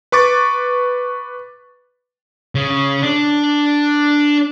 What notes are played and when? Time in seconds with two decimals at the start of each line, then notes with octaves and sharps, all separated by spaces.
0.12 B4 C#6 D6 A6
2.55 C#3
3.02 D4